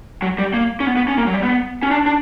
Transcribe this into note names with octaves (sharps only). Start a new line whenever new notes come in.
F#3
G3
A#3
C#4
B3
B3
C#4
A#3
F#3
G3
B3
C#4
D4
D4